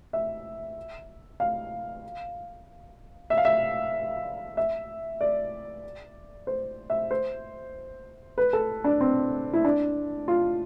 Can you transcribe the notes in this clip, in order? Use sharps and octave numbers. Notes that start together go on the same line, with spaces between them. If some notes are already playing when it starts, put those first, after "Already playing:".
E5
F5
E5
F5
E5
E5
D5
C5
E5
C5
B4
A4
D4
C4
E4
D4
F4